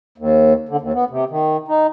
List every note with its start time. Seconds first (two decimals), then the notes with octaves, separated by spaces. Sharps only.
0.18 D#2
0.69 D3
0.81 D#2
0.94 B3
1.10 C3
1.30 D#3
1.68 D#4